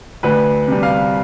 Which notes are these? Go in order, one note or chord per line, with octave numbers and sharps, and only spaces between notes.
D2 B4
C3 G3
F5